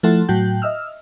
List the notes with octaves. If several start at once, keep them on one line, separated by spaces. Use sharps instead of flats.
F3 A3 E4 A4 F#5 C6
A2 F#3 F#4 G5 G6
D#5 E5 E6 F6